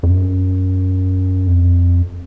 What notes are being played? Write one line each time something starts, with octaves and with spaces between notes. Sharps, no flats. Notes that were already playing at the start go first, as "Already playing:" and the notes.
F2
F#2
F2